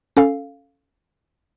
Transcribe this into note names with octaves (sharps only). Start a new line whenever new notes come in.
C#4 A4 F5